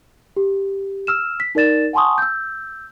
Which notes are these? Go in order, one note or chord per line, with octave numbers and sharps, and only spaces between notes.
G4
E6 F6 E7
B6
D#4 A#4 D5 A6 E7
F#5 G#5 A5 C6 C#6 D#6
E6 G6